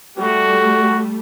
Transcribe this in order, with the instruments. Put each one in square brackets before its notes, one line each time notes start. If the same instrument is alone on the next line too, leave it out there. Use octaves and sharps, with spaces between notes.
[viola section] G3 A3 [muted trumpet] F#4